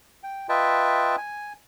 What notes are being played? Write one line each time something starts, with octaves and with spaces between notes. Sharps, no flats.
G5
F4 B4 D#5 E5 G5 A5
G#5